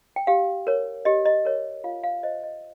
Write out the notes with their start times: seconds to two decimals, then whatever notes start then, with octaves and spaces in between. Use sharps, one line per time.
0.16 G5
0.27 G4 F5
0.67 A#4 C#5
1.05 G4 D#5
1.25 D#5
1.45 A#4 C#5
1.84 F4 F5
2.04 F5
2.23 C5 D#5
2.43 D#5